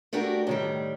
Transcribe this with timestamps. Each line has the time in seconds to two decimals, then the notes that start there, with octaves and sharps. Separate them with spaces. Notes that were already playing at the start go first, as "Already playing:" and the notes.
0.13 A3 D4 F#4 G4 A#4
0.47 A2 D#3 G3